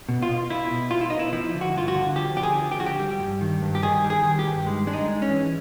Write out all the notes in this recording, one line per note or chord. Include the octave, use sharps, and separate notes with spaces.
B2
F4
B2
B2 E4
B2
B2 F4
E4
B3 D#4
E4
F3 E4
D3
F#4
G2 F4
F#4
D3
F3 G4
D3 G4
G#4
F3
G4
D3 F#4
G4
G3
G2
D#3
G2
G4
D#3 G#4
G3
G#4
D#3
G4
G2
G#3
G#3 D4
D#4
G#3
C#4
E3